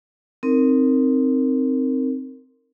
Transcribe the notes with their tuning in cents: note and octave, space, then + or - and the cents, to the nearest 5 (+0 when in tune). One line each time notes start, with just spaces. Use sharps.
C4 +0 D#4 +0 A#4 -15